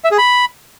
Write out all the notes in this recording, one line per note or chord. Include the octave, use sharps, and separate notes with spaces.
E5
G#4
B5